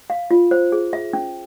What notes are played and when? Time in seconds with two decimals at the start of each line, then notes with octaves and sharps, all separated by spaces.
0.10 F5
0.31 F4
0.51 C5
0.72 G#4
0.93 E5
1.13 C#4